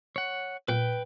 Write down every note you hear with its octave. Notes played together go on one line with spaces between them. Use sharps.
C#5 F#5
A#2 B4 G5